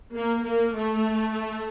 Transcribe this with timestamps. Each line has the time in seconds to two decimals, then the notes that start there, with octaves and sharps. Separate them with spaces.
0.15 A#3
0.46 A#3
0.77 A3